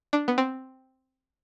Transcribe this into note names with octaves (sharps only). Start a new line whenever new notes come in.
D4
B3
C4